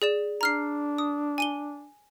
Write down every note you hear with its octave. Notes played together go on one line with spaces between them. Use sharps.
G#4 D5 E7
D4 A#5 F6 C7
D#6
G#5 D#7 G7